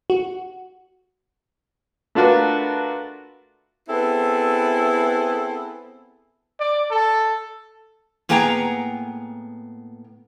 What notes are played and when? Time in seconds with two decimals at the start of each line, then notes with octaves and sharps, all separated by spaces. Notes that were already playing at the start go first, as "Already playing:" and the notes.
0.10 F#4
2.15 A3 D4 F4 F#4 A#4 B4
3.89 B3 C4 E4 G#4 A4
6.60 D5
6.91 A4
8.29 A2 A#3 B3 G#4 G5 A#5